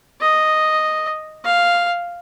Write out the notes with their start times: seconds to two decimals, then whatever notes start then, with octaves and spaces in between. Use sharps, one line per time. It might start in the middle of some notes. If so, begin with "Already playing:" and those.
0.21 D#5
1.45 F5